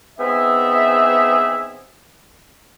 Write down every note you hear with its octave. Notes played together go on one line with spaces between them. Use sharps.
B3 C4 D#4 G#4 E5